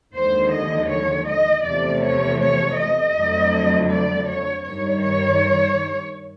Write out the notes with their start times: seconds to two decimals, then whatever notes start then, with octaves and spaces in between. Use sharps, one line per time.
0.15 D#2 D3 F3 G#3 C5
0.52 D#5
0.90 C#5
1.28 D#5
1.65 E2 C3 F3 A3 D5
2.03 C#5
2.41 C#5
2.77 D#5
3.15 F2 D3 F#3 A3
3.90 D5
4.28 C#5
4.65 G2 D#3 G3 C#5
5.02 C#5